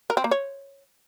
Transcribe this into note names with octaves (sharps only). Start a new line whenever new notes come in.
A#4
C4
A#3
C#5